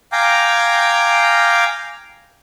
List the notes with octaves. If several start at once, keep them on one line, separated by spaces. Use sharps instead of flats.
F5 G5 G#5 A#5 D6